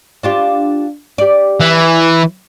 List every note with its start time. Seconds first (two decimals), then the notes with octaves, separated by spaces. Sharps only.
0.23 D4 F4 G4
1.18 G4 D5
1.60 E3